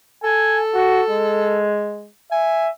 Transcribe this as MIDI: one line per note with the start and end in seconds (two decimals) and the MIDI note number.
0.24 1.68 69
0.24 0.59 80
0.74 1.02 66
1.10 2.10 56
2.32 2.70 76
2.32 2.68 80